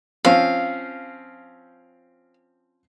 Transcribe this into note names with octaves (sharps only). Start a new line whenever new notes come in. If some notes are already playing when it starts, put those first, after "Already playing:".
F3 C4 C#4 F5